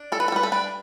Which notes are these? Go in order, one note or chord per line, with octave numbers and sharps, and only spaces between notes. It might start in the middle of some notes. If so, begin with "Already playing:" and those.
Already playing: D4
G3 A4
B4
A4
G3 B4
A4
D4 B4